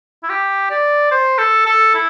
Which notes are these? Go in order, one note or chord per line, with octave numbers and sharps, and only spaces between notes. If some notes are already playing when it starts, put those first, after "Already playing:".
E4
G4
D5
C5
A4
A4
E4